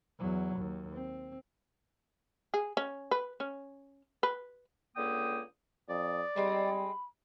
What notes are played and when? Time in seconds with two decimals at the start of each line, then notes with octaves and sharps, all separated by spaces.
0.19 E2 F#3
0.56 D#2
0.93 C4
2.54 G#4
2.77 C#4
3.11 B4
3.40 C#4
4.23 B4
4.95 C#2 D3 A#3 G5 D#6
5.89 F2 D5 D#6
6.36 G3 G#3 C4 D#4 B5